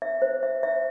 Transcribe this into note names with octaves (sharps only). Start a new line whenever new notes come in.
E5
C5
E5
E5